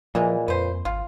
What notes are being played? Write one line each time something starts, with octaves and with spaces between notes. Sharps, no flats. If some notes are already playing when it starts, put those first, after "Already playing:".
A#2 E3 F3 G#3
F2 B4 C5
G#1 F4